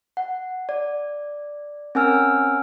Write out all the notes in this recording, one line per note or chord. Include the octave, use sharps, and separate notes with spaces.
F#5
D5
C4 C#4 A#4 G#5 E6 F6